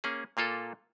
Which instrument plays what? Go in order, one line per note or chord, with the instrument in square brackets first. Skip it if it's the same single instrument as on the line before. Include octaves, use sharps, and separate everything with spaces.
[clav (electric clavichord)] A#3 C#4 G#4
A#2 A#3 F4 A4